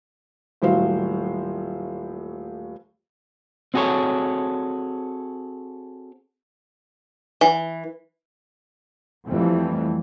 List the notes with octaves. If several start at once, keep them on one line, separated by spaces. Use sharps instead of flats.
D#1 A2 F#3 F#4 C5 F5
C4 F#4 G#4 A4 C#5
E3
F2 E3 G3 A3 C4